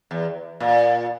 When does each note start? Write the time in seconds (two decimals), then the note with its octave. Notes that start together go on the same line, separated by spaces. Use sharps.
0.11 E2
0.60 A#2